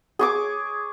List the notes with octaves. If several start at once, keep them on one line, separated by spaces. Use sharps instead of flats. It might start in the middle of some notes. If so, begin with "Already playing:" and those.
G#4 C#6 D6